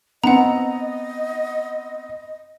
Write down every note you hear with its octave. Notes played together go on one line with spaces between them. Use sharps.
B3 C4 D#5 F#5 A#5